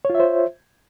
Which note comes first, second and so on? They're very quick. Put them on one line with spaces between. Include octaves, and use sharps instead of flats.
C#5 F4 E5 C5